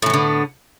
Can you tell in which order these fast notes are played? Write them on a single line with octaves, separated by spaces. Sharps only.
A2 E3 B3 D3